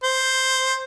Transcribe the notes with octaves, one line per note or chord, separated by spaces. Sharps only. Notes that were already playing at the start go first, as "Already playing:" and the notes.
C5